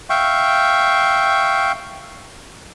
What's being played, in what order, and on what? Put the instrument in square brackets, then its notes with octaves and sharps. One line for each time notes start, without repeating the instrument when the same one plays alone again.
[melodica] E5 F5 G5 C#6